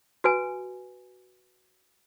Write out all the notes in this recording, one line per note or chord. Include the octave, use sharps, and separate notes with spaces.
F#4 B4 G#5